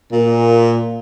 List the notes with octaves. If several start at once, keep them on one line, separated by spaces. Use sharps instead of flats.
A#2